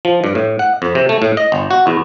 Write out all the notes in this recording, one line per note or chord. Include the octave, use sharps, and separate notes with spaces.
F3
G2
A2
F#5
F2
C3
A3
A2
D#5
G1
F#4
E2